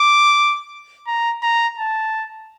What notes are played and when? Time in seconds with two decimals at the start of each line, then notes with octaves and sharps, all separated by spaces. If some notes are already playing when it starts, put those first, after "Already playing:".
Already playing: D6
1.07 A#5
1.42 A#5
1.78 A5